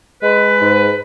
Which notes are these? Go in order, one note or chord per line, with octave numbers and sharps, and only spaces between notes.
G#3 B4
G#2